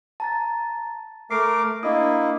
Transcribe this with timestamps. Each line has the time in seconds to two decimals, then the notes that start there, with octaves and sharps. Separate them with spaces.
0.20 A5 A#5 A6
1.31 A3 A#4 D6 C7
1.83 A#3 D4 E4 D#5 D#6